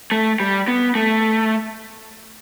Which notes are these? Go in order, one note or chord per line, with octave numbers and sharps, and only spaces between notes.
A3
G3
B3
A3